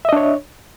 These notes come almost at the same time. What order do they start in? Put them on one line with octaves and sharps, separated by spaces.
E5 D#5 D4 C#5